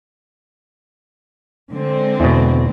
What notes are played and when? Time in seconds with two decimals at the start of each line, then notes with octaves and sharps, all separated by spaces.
1.71 D3 G#3 C4
2.20 E2 B2